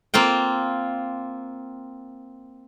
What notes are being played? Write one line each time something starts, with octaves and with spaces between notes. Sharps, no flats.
A#3 C4 F4 G5